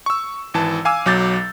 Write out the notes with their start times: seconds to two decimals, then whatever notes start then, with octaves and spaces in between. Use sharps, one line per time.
0.06 C#6 E6
0.54 G#1 E3 A5
0.85 F5 G#5 D6 E6
1.06 B1 F#3 D6 G6 A6